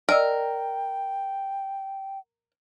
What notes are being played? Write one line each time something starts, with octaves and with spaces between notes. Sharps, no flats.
A#4 D5 D#5 G5 E6